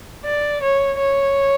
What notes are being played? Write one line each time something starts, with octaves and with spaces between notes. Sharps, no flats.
D5
C#5
C#5